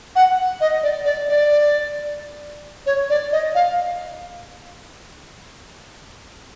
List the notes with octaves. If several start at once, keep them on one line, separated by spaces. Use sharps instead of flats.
F#5
D#5
D5
D5
D5
C#5
D5
D#5
F5